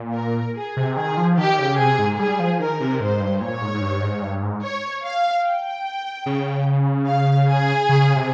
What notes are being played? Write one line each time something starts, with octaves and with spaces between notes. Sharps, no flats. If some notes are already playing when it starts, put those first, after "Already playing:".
Already playing: A#2
A#4
G#4
C3
D#3 G#4
F3
D#3 G4
C#3
C3 G#4
G#2
G3 G#4
F3
D#3 A#4
C3
G#2 C5
G2
A#2 C#5
G#2
G#2
G2
G#2
G2
G#2
C#5
F5
G5
C#3
F5
G#4
C#3
C3